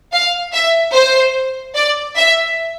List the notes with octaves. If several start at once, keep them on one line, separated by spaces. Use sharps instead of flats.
F5
E5
C5
D5
E5